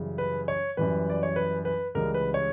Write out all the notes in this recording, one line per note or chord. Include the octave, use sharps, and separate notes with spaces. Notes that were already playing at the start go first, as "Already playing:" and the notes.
Already playing: F#2 C#3 E3 G3
B4
C#5
F#2 E3 G3 B4
D5
C#5
B4
B4
C#2 C#3 E3 G3 A#4
B4
C#5